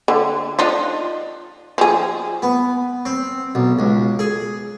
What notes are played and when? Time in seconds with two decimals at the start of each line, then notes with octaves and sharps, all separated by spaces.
0.08 D3
0.59 D4 D#4 F4
1.78 F3 G#4
2.42 B3
3.06 C4
3.55 B1
3.79 C#2
4.19 G#4